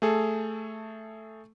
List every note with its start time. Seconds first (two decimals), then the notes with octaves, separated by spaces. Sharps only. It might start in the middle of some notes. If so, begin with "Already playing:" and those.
0.02 A3 G#4 A4